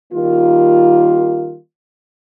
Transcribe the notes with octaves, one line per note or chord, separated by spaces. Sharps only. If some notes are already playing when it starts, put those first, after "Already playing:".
D#3 G3 A#3 F4